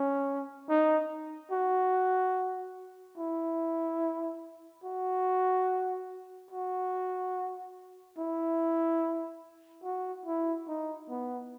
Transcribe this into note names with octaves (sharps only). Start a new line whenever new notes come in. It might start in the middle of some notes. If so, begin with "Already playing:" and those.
Already playing: C#4
D#4
F#4
E4
F#4
F#4
E4
F#4
E4
D#4
B3